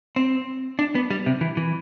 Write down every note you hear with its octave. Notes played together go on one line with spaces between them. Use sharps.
C4
D4
B3
G3
C3
E3
E3